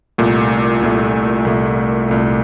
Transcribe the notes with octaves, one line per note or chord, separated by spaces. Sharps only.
C2 A#2 A3
C2 A#2 A3
C2 A#2 A3
C2 A#2 A3